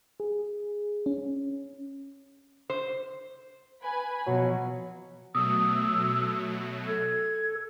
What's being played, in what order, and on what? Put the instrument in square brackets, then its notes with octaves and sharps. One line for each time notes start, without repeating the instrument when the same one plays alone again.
[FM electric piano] G#4
C#4
[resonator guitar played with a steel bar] C5
[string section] B4 G#5 B5
[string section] B2 F3 [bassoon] F#3
[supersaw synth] B2 F#3 A3 [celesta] D#6 [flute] E6
[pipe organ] A4 [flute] G#6